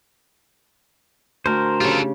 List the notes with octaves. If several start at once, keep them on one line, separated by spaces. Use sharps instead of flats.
D2 A#4 C5
C#3 F4 G4 A4